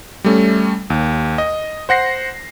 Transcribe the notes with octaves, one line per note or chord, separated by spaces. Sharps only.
G3 A3 C#4
D#2
D#5
C5 F#5 A#6 C7